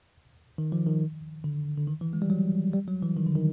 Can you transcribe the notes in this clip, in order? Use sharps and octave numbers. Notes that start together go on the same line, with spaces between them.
D#3
F3
D#3
D3
D3
D#3
E3
G#3
G3
F#3
G3
F#3
E3
D#3
D3
D#3